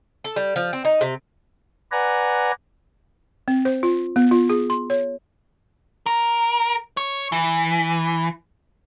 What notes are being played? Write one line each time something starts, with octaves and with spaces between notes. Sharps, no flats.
A4
G3
F3
C4
D#4
C3
B4 D5 F#5 G#5 A#5
C4
C5
F4
B3
F4
G#4
C6
C#5
A#4
C#5
E3